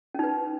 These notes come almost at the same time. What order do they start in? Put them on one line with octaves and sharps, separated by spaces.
C#4 D#4 B4